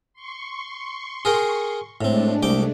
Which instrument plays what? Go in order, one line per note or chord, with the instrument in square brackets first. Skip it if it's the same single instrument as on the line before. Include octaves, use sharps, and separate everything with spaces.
[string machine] C6 C#6
[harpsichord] G#4 A#4 G5
[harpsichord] A2 C4 [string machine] G#3 A3 D4
[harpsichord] C2 G5 D6